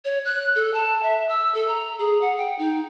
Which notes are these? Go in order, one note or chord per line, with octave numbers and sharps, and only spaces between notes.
C#5
F#6
A4
A5
E5
E6
A4
A#5
G#4
F#5
G5
D#4